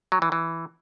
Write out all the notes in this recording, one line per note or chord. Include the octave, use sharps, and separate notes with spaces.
F#3
E3
E3